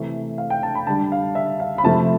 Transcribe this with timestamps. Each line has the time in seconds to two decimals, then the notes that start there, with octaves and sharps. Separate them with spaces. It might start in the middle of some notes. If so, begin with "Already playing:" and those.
Already playing: C3 E3 A3
0.38 F5
0.50 G5
0.63 A5
0.75 B5
0.87 D3 G3 A5
1.12 F5
1.35 E5
1.60 F5
1.78 B5
1.84 C3 F3 A3 A5